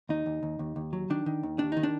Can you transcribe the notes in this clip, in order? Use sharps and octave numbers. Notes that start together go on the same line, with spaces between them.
D#2 D#4
D#2
D#2
D#2
D#2
F#3
D#3 D4
D#3
D#2
D#2 D4
D#3 D#4
D4